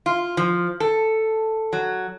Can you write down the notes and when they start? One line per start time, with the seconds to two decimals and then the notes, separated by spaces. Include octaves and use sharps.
0.06 F4
0.37 F3
0.80 A4
1.73 F#3